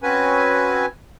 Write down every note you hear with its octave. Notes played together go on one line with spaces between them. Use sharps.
C4 C#4 F#4 B4 G#5